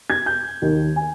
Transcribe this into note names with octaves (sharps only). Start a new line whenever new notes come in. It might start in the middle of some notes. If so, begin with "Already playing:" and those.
G#6
G6
D#2 D#3 A#3
G#5